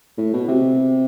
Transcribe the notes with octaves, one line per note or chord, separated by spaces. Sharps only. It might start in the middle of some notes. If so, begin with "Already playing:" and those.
A2
B2
C3